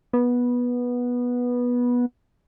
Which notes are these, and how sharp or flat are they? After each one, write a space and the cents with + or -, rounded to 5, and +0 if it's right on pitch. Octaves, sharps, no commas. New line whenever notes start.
B3 -15